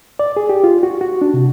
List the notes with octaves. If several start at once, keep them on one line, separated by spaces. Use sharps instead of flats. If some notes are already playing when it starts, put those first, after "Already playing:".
D5
G#4
G4
F4
F#4
F#4
D4
C3